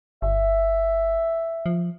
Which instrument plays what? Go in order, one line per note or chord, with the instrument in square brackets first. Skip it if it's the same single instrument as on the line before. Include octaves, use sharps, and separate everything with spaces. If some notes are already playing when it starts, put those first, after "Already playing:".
[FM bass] G1 [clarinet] E5
[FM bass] F3